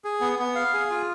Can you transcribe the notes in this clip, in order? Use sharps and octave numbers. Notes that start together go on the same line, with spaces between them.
G#4
B3
B3
F5
G#4
F4